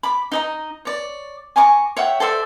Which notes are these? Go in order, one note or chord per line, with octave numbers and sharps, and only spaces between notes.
B5 D6
D#4 D#5 A#5
C#5 D5
G#5 A#5 C#6 D6
C#5 E5 F#5 G5
A4 C5 D5 E5